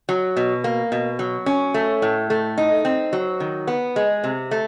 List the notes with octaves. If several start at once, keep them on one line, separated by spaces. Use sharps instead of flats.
F#3
B2
A#3
B2
F#3
C#4
A3
A2
A3
D#4
C4
F#3
D#3
B3
G#3
C3
A3